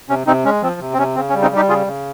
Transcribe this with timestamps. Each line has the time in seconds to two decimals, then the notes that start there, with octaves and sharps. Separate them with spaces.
0.09 C3 C#4
0.27 C3 C4 D#4
0.45 G#3 C#4
0.62 F3 C4
0.80 C3
0.93 C4
0.98 C3 C#4
1.16 C#3 C4
1.30 C#4
1.33 G3
1.42 C4 D#4
1.51 G3
1.56 D#4 G4
1.69 C#3 F4 G#4
1.87 C#3